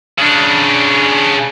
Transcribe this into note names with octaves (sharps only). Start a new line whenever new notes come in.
C#3 D4